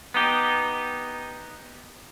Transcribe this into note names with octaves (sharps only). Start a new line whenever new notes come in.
B3 D#4 G4